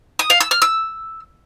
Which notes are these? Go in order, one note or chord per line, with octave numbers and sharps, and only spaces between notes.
D#6
F5
E6
F6
E6